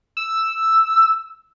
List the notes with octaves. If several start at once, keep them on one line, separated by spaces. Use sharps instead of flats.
E6